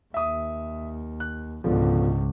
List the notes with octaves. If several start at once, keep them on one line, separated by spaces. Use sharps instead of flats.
D#2 E5 D#6
F#6
C#2 G#2 B2 D3 F3